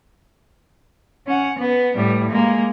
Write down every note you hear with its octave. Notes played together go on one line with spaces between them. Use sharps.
C#4 F#5
B3
A2 G3
G#3 A#3